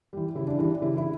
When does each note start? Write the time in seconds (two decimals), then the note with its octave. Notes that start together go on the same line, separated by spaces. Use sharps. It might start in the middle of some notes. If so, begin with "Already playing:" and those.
0.13 E3 G3
0.35 C#3 E4
0.47 D4
0.59 E3 G3 D4
0.82 C#3 E4
0.97 E4